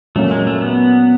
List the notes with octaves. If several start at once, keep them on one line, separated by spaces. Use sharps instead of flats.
A#2 F#3 A3 A#3 C#4
G#3
A3
B3